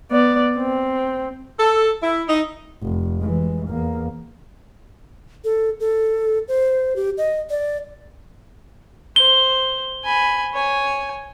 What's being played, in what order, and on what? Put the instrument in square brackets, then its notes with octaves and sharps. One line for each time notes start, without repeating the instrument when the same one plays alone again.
[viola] B3 D5
C4
[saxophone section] A4
E4
D#4
[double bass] F1
E3 G#3
E2 A#3
[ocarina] A4
A4
C5
G4
D#5
D5
[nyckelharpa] C5 [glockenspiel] G7
[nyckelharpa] G#5 B5
C#5 G#5